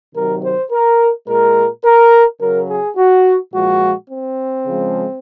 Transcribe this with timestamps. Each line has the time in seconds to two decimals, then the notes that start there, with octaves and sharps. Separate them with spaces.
0.14 C3 D#3 F#3 A#4
0.42 C5
0.71 A#4
1.27 A#2 G#3 A#4
1.84 A#4
2.40 C#3 F#3 A#4
2.68 G#4
2.97 F#4
3.53 A#2 F3 G#3 F#4
4.09 C4
4.66 C#3 F3 G#3